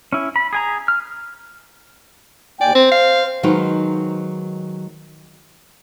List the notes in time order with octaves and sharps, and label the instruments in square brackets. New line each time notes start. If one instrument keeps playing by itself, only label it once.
[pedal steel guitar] C#4 E4
B5
G#4 G#5 A#5
F6
[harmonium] D#2 G5 G#5 [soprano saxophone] D5
[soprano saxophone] C4 [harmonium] C5
[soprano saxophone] F5
[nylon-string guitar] D#3 F#3 G#3 D#4 B4 C5